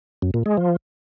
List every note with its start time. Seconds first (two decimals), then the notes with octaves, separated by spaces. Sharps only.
0.22 F#2
0.34 A#2
0.46 G#3
0.57 F3